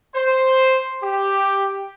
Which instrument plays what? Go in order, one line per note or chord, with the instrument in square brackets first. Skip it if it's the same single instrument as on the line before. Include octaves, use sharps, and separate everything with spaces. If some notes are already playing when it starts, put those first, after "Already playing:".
[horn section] C5
G4